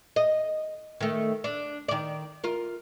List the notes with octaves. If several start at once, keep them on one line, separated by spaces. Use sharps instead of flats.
D#5
D#3 A3
D4
D#3 D5
F4 A#4